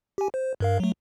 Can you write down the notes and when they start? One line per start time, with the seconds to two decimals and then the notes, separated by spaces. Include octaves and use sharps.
0.18 G4 G#5
0.34 C5
0.60 G2 A#4 F5
0.80 F#3 A3